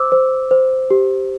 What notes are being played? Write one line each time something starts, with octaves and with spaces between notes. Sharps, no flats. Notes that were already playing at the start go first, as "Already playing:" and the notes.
Already playing: C5 D6 E6
C5
C5
G4